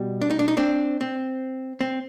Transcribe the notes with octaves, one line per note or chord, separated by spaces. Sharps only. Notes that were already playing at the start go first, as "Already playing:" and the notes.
Already playing: B2 G3
D4
D#4
D4
D#4
C4 D4
C4
C4